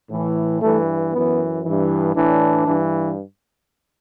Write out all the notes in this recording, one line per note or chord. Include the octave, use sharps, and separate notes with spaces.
A2 E3
G2 E3 A3
F#2 E3 B3
G2 E3
A2 E3 D4
G2 E3